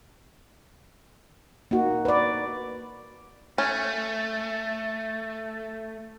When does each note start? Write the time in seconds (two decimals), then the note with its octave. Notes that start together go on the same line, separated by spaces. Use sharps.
1.71 A#3 D#4 F#4
2.05 B4 D5
3.58 A3 C#4